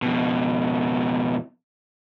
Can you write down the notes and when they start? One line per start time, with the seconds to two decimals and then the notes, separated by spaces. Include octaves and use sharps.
0.02 F2 B2